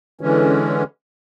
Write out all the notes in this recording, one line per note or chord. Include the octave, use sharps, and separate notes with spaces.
D3 E3 G#3 C#4